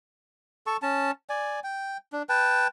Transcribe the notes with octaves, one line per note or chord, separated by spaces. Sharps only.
A4 A5 C#6
C#4 A5
D5 G#5
G5
D4
B4 G5 A5